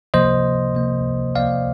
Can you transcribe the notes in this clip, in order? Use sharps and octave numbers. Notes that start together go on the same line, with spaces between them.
C3 F3 A#3 C5 D#5
C3 F3 A#3
C3 F3 A#3 D5 F5